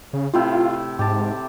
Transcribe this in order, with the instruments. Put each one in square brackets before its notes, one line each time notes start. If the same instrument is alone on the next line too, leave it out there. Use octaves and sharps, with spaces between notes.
[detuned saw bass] C#3
[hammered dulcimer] A2 C3 E4 [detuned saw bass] F4
[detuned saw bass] G#2 [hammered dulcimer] G4 A5